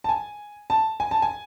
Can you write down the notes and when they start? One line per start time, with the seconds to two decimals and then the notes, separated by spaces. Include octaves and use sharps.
0.04 A5
0.09 G#5
0.70 A5
1.00 G#5
1.11 A5
1.22 G#5